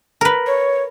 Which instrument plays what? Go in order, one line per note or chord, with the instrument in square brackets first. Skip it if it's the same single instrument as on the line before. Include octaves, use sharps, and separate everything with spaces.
[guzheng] A#4 B4
[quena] C#5